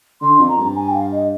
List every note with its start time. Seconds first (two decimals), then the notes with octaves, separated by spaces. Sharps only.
0.21 D3 C6
0.39 F2
0.48 A#5
0.58 G2
0.75 G#5
0.88 G5
0.94 F5
1.12 D#5